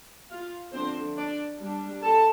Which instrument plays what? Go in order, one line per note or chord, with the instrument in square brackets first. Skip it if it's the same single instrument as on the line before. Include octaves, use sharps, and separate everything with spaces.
[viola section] F4 F5
D3 F3 A3 C4 D4 C5
D4 D5
G3 D4
A4 A5